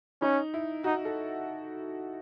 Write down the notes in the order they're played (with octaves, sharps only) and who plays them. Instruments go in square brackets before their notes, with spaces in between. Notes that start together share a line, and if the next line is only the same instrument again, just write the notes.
[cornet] C#4 [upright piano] D#4
[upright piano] E4
[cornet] D#4 [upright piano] F#4
[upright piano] A4